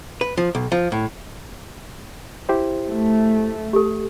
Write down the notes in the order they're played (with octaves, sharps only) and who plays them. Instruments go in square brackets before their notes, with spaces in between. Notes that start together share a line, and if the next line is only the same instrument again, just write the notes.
[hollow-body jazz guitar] B4
F3
B1
F3
A2
[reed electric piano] E4 G4 C5
[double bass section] A3
[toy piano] G4 A4